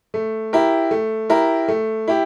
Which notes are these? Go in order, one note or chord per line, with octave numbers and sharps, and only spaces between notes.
A3
E4 G4 A#4
A3
E4 G4 A#4
A3
E4 G4